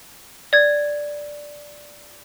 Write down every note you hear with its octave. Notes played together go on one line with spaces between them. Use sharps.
D5 G#6